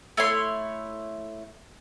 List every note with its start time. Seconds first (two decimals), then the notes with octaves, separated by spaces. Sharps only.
0.17 A3 E4 C#5 C6